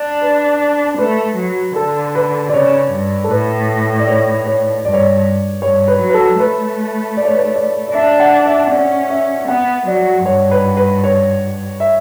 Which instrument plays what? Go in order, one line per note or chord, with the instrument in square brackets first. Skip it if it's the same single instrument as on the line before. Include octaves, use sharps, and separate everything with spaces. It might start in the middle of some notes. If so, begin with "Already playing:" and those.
Already playing: [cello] D4
[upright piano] B4
[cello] A3 [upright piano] B4
[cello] F#3
[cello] D3 [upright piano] A4
[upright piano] B4
D5
[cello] C#3 [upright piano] C#5
[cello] G2
[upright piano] A4
[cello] A2 [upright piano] B4
[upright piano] D5
C#5
C#5
[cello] G2 [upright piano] D5
[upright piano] C#5
D5
[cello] G2 [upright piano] C#5
[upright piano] B4
[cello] F#3
[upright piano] B4
A4
[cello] A3 [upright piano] B4
[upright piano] D5
C#5
B4
C#5
D5
D5
[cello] D4 [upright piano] E5
[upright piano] F#5
E5
[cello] C#4 [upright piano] D5
[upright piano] E5
[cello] B3 [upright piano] F#5
[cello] F#3 [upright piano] D5
[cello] G2 [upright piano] C#5
[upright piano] B4
B4
C#5
E5